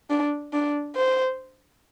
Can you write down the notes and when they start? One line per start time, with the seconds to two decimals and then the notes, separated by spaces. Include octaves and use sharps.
0.10 D4
0.53 D4
0.96 C5